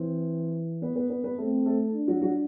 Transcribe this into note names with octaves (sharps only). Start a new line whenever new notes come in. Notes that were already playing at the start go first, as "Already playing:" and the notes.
Already playing: E3 C4
B3 B4
B3 B4
B3 B4
B3 B4
A3 C4 A4
A3 A4
D4
F#3 F#4
F#3 F#4